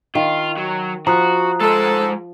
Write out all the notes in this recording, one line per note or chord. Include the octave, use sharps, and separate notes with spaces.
D#3 F4
F#3
F3 F#4 A#5 D#6 F#6
G#3 A4 C5